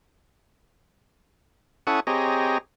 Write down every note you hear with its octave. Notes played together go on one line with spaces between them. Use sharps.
C#4 E4 A4 F#5 C#6 D#6
C4 G4 G#4 C#5 D#5 A#5